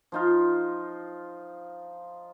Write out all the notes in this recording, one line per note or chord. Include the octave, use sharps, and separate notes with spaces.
F3 D#4 F4